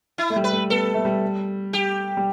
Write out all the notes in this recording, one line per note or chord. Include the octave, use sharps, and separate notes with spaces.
E4
A3
G3
B4
A3
B3 A4
A3
G3
G4
G3